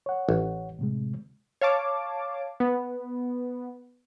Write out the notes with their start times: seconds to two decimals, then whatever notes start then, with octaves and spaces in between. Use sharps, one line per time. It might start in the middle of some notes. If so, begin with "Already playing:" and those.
0.06 C#5 F#5
0.29 A1
0.79 A2 C3 G#3
1.61 C#5 F5 A5 D6
2.60 B3